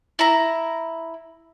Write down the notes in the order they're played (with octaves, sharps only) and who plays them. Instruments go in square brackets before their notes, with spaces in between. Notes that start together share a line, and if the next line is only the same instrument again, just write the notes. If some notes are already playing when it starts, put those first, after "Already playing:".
[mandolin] E4 A#5